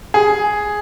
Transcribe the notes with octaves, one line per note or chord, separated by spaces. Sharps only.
G#4